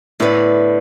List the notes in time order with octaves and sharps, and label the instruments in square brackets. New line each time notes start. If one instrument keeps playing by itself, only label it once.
[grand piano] A2 [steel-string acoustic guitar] D3 B3 E4 B4 D5